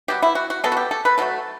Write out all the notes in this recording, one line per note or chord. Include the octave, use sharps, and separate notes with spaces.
B2 F#3 B3 G4
E4
F#4
F#4
B2 F#3 B3 A4
F#4
G4
A4
B4
B2 F#3 A3 A4